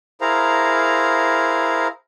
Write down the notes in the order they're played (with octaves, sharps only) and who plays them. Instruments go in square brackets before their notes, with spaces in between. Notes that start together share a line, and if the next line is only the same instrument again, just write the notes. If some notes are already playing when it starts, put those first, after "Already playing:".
[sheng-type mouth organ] E4 G#4 A#4 C5 F5 A#5